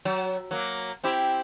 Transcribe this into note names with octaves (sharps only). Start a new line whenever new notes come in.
F#3
F#3 A#3
C4 E4 G4